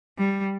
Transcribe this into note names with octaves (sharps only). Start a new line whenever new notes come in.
G3